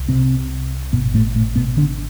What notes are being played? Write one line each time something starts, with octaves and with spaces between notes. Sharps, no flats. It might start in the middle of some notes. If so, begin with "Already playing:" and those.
Already playing: C2
C3 C4
G#1 G#2 B2 B3
A2 A3
A2 A3
B2 B3
D3 D4